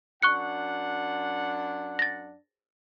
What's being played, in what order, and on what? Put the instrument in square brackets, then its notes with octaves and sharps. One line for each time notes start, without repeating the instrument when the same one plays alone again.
[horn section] F#2 D4 F#5 [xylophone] C#6 F#6 C#7
[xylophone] A6 A#6